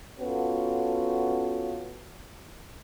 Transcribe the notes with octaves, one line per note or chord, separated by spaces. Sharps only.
B3 C#4 F4 F#4 A4